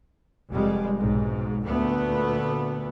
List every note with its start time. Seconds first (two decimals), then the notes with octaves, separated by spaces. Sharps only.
0.52 F1 F2 G3 G#3
0.99 B1 G#2
1.67 D2 A#2 A3 B3